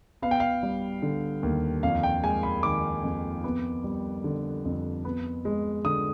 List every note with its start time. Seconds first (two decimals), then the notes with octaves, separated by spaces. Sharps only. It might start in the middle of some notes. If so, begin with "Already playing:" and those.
0.22 B3 F5
0.31 G5
0.40 F5
0.63 G3
1.02 D3
1.43 D#2
1.83 F2 F5
2.03 G5
2.23 G#3 G#5
2.43 B5
2.63 D#3 D6
3.03 F2
3.44 B3
3.84 G3
4.24 D3
4.65 F2
5.05 B3
5.45 G#3
5.85 D3 D#6